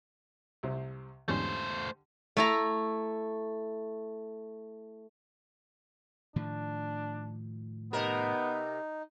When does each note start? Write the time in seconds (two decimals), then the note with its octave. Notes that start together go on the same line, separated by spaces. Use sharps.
0.63 C2 C3 C5
1.28 E2 G#2 D3 G3 A3 C#4 C5
2.37 A3 E4 A#5
6.36 A2 D#3 F3 D4
7.93 C3 B3 D#4 A#4